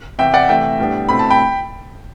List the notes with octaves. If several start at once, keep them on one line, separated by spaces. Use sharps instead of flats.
E2 C3 E3 E5 G5
D5 F#5
C3 E3 A3 E5 G5
A2 G3 B3 D4
B2 A3 C4 E4 B5
A5
G5 B5